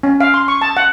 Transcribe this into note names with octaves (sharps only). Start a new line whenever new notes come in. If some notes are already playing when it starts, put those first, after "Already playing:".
C#4
F5
C6
C#6
A5
F#5